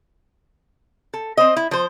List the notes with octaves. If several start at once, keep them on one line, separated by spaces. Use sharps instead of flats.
A4
C4 C5 D#5
E4
F3 C5